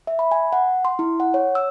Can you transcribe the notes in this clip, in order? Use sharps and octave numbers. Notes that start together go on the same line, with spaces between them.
E5
B5
G#5
F#5
C6
E4
F#5
C#5
E6